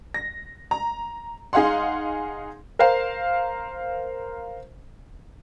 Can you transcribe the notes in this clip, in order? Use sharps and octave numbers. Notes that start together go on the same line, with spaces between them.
A#6
A#5
D#4 G#4 F5 F#5 C6
A#4 C5 F5